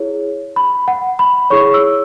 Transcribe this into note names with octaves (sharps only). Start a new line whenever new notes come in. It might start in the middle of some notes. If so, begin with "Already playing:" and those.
Already playing: E4 G#4 C#5
B5
F#5
B5
E4 G#4 C#5 C#6
E6